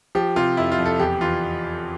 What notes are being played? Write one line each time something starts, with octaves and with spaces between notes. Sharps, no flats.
F3 G4
C3 F4
F2 E4
F4
F2
A4
E2 G4
E3 F4